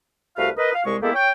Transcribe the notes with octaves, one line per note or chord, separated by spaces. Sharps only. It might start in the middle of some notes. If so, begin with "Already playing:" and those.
C2 A3 F#4 B4 F5
A#4 B4 D#5
F5
C2 G#3 C#6
G#3 A#3 B3 E4 G4 A4
C#5 G5